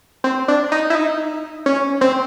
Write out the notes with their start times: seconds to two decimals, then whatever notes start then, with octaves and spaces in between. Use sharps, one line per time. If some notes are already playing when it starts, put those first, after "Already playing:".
0.24 C4
0.48 D4
0.72 D#4
0.90 E4
0.95 D#4
1.66 C#4
2.01 C4